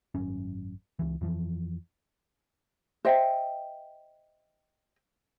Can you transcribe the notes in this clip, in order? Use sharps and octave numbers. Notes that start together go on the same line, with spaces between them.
G#1 F#2 C#4
C#2 E3
F2 E3 F3
C5 D#5 E5 G5